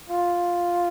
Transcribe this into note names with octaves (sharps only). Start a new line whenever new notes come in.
F4